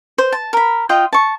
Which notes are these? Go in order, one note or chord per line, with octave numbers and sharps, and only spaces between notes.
C5
A5
A#4 B5
F4 D#5 G5
A5 C#6